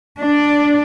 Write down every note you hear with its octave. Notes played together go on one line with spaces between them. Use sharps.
D4 D5